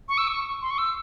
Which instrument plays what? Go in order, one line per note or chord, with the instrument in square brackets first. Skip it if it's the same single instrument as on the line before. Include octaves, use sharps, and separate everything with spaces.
[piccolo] C#6
E6
C#6
C6
C#6
E6